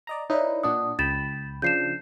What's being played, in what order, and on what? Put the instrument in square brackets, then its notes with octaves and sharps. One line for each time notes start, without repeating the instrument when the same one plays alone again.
[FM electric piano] D5 D#5 A#5
[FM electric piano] D#4 E4 B4 [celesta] C#5 D5
[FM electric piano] A#2 D4 F#5 [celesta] D#6
[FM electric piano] C#2 G5 B5 [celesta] A6 E7
[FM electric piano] C#3 F3 D4 [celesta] G6 C7 E7